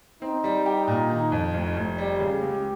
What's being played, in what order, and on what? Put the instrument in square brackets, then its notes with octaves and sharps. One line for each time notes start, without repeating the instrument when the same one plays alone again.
[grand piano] C4 [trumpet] D#4
[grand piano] G3
G4
A#2
D#3
F2
F1
F1
[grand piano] G3 [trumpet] G4
[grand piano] C#3
C#2